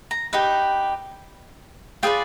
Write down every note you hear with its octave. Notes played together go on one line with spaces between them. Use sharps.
A#5
D#4 G4 B4
F4 G#4 B4 D5 G5